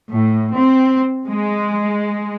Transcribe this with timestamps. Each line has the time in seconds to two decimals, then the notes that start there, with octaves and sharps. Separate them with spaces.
0.11 A2
0.55 C4
1.27 G#3